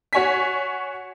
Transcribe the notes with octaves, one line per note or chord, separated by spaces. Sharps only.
F#4 C#5 G#5 B6